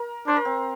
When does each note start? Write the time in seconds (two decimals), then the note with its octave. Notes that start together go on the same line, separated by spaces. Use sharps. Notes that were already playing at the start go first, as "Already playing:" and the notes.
Already playing: A#4
0.27 D4 C5
0.36 A#4
0.45 C4